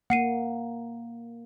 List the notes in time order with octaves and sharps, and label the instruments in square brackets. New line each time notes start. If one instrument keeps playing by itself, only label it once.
[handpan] A#3 [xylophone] F#5 C7 D#7